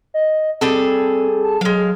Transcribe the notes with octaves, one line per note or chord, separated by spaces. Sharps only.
D#5
G3 C4 G#4 A4
A5
F#3 G#3 F5